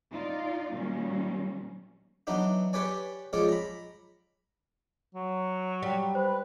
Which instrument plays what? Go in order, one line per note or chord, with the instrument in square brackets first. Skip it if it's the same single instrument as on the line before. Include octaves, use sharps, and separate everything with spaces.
[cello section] D#4 F4 D5
A#2 D#3 F#3 G3 A#3 C#4
[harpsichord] E3 F#3 B3 D4 D#4
G4 B4 C#5 D5 G#5
F3 G#3 C4 C#4 C#5 D5
A#5 B5
[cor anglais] F#3
[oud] G3
[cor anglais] B4 [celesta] C5